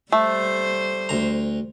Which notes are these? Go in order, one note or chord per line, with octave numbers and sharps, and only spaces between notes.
G3 A3 C5
D2 A#5